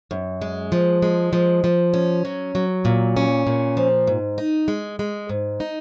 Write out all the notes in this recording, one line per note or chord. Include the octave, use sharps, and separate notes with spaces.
F#2
G#3
F3
G#3
F3
F3
C#4
F#3
F#3
A#2
C#4
A#2
F3
G#2
D#4
G#3
G#3
G#2
D#4